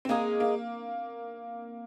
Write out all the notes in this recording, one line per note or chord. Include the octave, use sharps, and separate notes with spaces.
C4
G#3 A#3 D#4 G#4
A#3